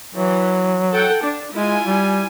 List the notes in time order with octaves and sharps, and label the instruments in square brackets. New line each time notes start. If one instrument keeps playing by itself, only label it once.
[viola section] E3 [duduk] F#3
[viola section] A4 F#5 G5
D4
[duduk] G#3 [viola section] E4 F4 G#5
[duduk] G3